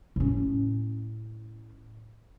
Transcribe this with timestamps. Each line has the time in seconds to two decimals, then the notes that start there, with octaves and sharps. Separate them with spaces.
0.16 A2 C#4